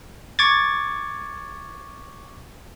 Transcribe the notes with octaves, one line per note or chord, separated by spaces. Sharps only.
C#6 D6 G#6 A6